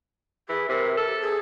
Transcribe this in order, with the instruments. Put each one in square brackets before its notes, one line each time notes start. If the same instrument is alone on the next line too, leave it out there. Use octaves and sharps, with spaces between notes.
[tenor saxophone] E3 [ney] G#4
[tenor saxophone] C3 [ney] A#4
[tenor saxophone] A4
[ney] G#4